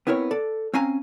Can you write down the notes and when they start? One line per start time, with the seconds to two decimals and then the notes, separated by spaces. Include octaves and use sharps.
0.07 B3 C4 E4 A#4 C#5
0.31 A4 D5
0.74 C4 C#4 F5 G#5 A#5